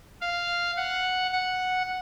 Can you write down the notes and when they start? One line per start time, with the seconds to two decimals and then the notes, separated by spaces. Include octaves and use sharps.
0.21 F5
0.77 F#5
1.33 F#5